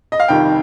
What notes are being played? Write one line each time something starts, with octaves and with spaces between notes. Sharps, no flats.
D#5
F5
F1 F2 D#3 G3 G5